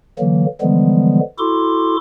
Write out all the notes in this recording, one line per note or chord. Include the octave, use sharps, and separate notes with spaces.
D3 E3 F#3 A#3
D3 E3 F3 G3 G#3 B3
E4 F#4 A4 C6 D6